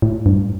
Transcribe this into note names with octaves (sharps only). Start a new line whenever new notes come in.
A2
G2